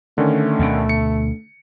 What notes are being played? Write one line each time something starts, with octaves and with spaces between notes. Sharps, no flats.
D3 D#3 A3 C#4
D2 B2
C#7